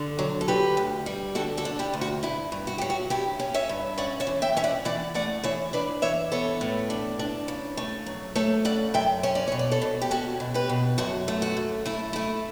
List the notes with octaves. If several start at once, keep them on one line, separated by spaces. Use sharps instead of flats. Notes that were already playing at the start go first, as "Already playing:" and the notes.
Already playing: D3
F#3
A4
D3 G4 B4
D2
G3
D3 F#4 A4
F#4 A4
D4
E4 G4
D2
F#4
G2 E4
G2
F#4
F#3 G4
F#4
G2 E4 G4
C#4
C#5 E5
G2
C#4 D5 F#5
C#5 E5
E3
E5 G5
C#4 E5
D5 F#5
E3 D5 F#5
A3 D5 F#5
E3 C#5 E5
D4 B4 D5
E3 C#5 E5
B3 A4 C#5
A2
D4
D4
C#3
A3
F#3
A3 A4 C#5
C#3 D5 F#5
F#2 E5 G5
C#4 C#5
D5
B2 C#5
D5
A4 C#5
B2
G4
C#4 F#4 A4
B2
G4 B4
B2
F#2 F#4 A4
A3
F#4
F#2
A3 E4
A3 E4